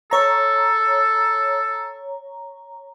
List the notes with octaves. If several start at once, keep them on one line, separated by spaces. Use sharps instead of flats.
A4 C#5 A#5